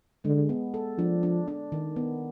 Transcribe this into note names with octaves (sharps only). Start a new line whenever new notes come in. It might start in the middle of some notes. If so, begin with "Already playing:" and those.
D3 G#3
B3
A4
F3 D4
D4
D4
D#3
B3